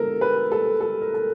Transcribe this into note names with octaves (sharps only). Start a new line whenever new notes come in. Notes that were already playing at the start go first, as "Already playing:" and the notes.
Already playing: D3 F3 G#3 B3 A4 A#4
B4
A4
A4
A#4
A4